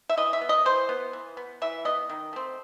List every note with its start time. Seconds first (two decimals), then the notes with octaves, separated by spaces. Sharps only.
0.09 E5
0.17 E3 D#5
0.33 E5
0.41 B3
0.49 D#5
0.65 E3 C5
0.89 B3
1.13 E3
1.37 B3
1.62 E3 E5
1.85 B3 D#5
2.10 D#3
2.33 A3 C4